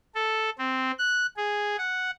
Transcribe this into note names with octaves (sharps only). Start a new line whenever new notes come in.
A4
C4
F#6
G#4
F#5